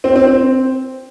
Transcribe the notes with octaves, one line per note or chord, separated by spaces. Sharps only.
C4
C4
C4